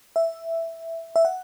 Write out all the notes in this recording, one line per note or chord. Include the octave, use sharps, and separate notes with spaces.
E5
E5
F#5